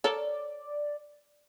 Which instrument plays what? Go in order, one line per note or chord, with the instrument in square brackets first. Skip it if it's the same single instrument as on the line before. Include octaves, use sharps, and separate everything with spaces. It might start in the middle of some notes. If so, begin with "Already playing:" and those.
[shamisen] A4 A#4 C#5 [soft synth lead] D5